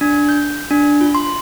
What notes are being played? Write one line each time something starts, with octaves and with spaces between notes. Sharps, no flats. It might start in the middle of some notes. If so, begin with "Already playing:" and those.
D4
G6
D4
F4
C6